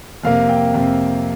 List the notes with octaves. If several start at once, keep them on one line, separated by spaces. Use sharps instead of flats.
F2 C3 A#3 F5
G5
F2 C3 A#3